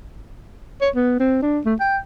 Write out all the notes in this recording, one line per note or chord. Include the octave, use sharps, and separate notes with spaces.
C#5
B3
C4
D4
A3
G5